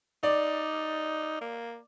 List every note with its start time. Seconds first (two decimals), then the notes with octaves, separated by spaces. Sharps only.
0.23 D#4 D5
1.41 A#3